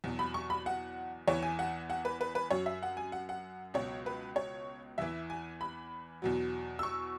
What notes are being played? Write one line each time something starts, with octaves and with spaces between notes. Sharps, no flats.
E2 B2 F#3
B5
C#6
B5
F#5
E2 E3 C#5
G#5
F#5
F#5
B4
B4
B4
F#2 F#3 C#5
E5
F#5
G#5
F#5
F#5
C#2 B2 F#3 C#5
B4
C#5
E2 E3 E5
G#5
B5
E2 B2 F#3
E6
C#6